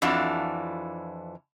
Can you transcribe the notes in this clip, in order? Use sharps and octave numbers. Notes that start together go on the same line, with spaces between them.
F2 E3 D4 F4 F#4